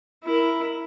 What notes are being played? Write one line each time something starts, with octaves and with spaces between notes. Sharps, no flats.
E4 A#4